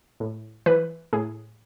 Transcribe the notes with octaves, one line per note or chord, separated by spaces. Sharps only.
A2
E3 B4
A2 G#4